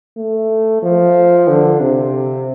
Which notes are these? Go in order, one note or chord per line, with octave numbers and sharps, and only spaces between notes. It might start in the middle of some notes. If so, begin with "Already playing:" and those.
A3
F3
D3
C3